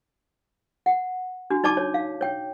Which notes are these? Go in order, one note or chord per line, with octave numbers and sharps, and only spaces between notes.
F#5
D4 F#4
D#4 D5 A5 D6
C#5
F5
C#5 G5